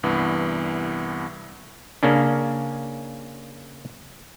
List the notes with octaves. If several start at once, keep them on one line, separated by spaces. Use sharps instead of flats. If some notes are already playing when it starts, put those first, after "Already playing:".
C2 G2 E3 B3
C#3 A#3 C#4 D4